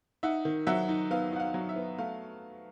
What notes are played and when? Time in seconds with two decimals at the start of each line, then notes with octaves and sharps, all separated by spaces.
0.23 D#4 E5 F#5
0.45 D#3
0.67 F#3 E5 F#5
0.89 D#4
1.11 B3 F5
1.32 D#4 F#5
1.40 F5
1.54 F#3
1.69 E5
1.76 B3
1.98 A3 F5